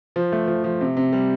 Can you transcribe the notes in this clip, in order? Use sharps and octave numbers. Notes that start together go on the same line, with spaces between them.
F3
A3
F3
F3
C3
C3
G3